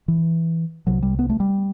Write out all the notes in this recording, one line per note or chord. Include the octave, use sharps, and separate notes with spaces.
E3
C2 C3 F#3
G3
B3
A3
G3